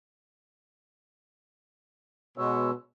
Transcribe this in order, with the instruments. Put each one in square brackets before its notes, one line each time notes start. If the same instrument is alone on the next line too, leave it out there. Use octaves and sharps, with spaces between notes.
[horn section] B2 [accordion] G#3 C#5 E6